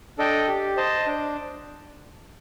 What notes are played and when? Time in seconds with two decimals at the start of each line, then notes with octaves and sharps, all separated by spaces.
0.18 D4 A4 D#5 G5
0.48 G4
0.77 C5 D#5 A5
1.07 D4